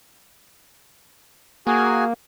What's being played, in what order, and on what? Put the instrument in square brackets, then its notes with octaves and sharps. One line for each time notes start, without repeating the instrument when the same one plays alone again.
[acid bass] A#3 [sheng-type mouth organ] F#4 G#4 G#5